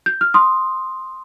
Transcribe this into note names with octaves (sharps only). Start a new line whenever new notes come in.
G6
F6
C6 D#6